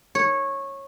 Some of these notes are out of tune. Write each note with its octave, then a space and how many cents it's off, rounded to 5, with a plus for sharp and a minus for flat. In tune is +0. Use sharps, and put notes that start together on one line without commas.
C#5 -15